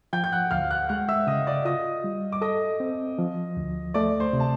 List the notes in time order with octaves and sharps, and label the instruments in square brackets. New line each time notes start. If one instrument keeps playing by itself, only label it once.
[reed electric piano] F3 [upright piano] G5 G6
[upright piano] G6
F#5 F#6
[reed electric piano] D2 [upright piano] F5 F6
[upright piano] F#5 F#6
[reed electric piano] G#3 [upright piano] F#5 F#6
[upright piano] E5 E6
[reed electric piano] C#3 [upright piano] D#5 D#6
[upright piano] D5 D6
[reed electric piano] F4 [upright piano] D#5 D#6
[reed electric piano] G3
[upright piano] D6
[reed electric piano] A4 [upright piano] D#5 D#6
[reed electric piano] C4
F3
D2
[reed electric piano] A3 [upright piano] D5 D6
[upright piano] C5 C6
[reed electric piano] C3
[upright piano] A5